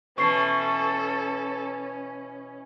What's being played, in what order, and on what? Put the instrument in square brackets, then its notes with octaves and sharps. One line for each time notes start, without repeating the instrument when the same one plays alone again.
[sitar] B2 E3 [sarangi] C#4 [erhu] A4 [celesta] C#6 C7